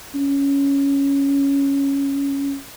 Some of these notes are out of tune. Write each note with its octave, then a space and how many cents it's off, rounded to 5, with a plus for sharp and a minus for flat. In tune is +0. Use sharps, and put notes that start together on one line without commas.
C#4 +5